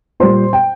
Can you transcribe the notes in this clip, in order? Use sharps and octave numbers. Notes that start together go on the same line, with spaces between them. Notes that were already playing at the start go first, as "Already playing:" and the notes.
A#2 G3 C5 C6
G5